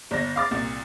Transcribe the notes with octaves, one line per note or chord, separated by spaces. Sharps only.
G1 D5 A#6
F5 D6 A6
C2 A#2